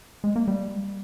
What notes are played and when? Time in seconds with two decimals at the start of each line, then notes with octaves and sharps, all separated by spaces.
0.24 G#3
0.36 A#3
0.48 G3